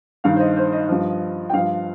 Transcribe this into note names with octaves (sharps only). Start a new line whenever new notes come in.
G2 D#3 F5
C5
D#5
C5
D#5
G2 F3
G5
G2 F3 F5